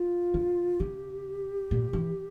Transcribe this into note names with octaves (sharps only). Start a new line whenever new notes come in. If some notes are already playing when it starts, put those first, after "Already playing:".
Already playing: F4
D3
C#3 G4
A#2
E3